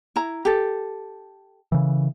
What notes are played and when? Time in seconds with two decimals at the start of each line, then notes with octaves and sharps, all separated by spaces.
0.16 E4 A#5
0.45 G4 A4
1.72 C#3 E3